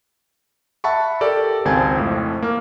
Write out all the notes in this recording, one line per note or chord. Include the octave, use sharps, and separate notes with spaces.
E5 F#5 A5 B5 C#6
G4 A4 A#4 D5
G#1 C#2 C4 G#5 A5 G#6
F2 A2
A#3 F6